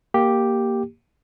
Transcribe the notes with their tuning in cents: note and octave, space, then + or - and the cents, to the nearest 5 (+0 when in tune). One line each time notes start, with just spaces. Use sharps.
A#3 +0 G4 +0